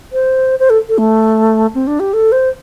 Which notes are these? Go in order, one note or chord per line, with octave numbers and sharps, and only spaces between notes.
C5
C5
A4
A4
A3
C4
D4
G4
A4
C5